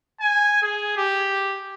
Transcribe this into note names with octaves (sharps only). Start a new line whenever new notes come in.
G#5
G#4
G4